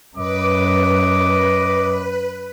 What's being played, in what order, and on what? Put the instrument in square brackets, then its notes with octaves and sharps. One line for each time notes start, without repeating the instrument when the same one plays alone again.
[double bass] F#2 [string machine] B4 [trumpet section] D#5 D6